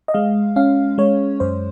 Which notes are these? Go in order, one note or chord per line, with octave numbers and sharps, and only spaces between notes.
D#5
G#3 F5
C#4 F5
G#3 C#5
F#2 C5